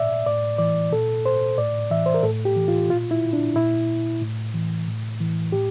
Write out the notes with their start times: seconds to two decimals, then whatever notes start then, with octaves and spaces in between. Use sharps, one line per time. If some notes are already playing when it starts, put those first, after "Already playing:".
Already playing: A#2 D5 E5
0.26 A2 D5
0.58 E3 D5
0.92 A#2 A4
1.26 C5
1.58 A2 D5
1.90 E3 E5
2.06 C5
2.14 A#4
2.23 A2 A4
2.45 G4
2.56 E3
2.68 F4
2.90 A#2 F4
3.11 E4
3.33 D4
3.56 A#2 E4
4.22 A2
4.54 E3
4.87 A2
5.20 E3
5.52 A2 G4